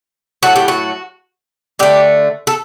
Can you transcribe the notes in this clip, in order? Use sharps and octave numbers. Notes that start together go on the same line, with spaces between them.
A2 F#3 A3 F#4
G4
F#4
D3 A3 G4
A4